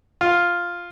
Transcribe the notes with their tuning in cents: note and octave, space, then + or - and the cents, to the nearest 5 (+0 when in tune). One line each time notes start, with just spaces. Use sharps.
F4 +0